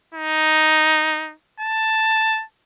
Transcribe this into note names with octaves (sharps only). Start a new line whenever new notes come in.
D#4
A5